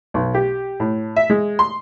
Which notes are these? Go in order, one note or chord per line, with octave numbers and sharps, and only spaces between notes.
B1
G4
A2
E5
G#3
C6